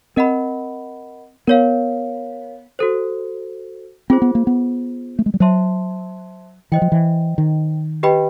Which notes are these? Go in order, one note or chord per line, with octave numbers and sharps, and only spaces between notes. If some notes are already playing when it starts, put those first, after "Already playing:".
C4 A#4 D#5 F#5 B5
B3 A#4 C#5 F5
F#4 A4 C5
C4 F4 G#4 C5
B3
A#3
B3
A3
G#3
G3
F#3 C5 E5 A5 C6
E3 C5 D#5 G5
F3
E3
D#3
G4 B4 D#5 G5 B5